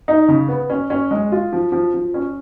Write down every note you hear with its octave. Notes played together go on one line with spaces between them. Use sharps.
D#4
C#3
B3
C#4
C#4
G#3
F4
F3
F3
F3
C#4